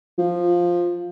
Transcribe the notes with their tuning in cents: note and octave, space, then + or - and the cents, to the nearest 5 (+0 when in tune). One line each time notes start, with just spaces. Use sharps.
F3 +5